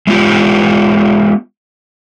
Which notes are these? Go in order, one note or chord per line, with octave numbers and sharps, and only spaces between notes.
G#3 B3 F4 G4